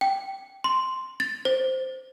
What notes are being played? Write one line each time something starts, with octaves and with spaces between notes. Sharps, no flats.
G5
C6
A6
C5